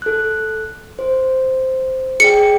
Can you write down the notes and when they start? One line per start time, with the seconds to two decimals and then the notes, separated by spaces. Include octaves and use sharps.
0.02 A4 F#6
0.99 C5
2.20 G#4 D5 G5 C#7